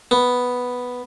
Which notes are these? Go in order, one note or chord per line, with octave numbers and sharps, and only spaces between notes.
B3